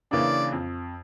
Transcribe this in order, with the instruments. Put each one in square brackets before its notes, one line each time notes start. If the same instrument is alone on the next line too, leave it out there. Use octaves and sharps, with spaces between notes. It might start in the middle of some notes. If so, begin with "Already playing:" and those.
[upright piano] C#3 E3 A#3 D4 [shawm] D5
[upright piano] F2